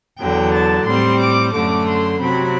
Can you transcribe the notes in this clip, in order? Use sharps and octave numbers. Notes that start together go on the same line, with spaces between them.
E2 D3 F#3 G5
A5
A2 G3 C4 C6
D6
F#2 D3 A3 D6
C6
C3 F#3 C4 B5